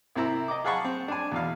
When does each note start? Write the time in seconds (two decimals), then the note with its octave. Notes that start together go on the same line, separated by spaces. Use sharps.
0.16 C2 C4 E4 A#5 E6
0.48 D#5 A#5 D6
0.64 G#4 F5 F#5 A5 B5 C#6
0.85 C4
1.08 D4 G#5
1.32 E2 B2 F5